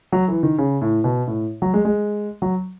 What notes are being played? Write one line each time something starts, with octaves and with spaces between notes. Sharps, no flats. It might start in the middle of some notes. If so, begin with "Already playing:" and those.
F#3
E3
D#3
C#3
A2
B2
A2
F#3
G#3
G#3
F#3